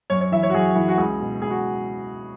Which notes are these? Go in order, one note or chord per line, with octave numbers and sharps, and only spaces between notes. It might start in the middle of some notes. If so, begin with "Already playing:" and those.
F#2 C#5
C#5
E3 E5
C#5
F#4
F#2 G#4
E3
F#4
C#2 G#4
B2
C#2 G#4
F#4